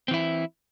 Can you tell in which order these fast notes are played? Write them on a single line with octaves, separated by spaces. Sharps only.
C4 E3 E4